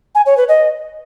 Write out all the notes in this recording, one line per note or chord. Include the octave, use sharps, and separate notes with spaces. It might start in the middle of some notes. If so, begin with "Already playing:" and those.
G#5
C#5
B4
D#5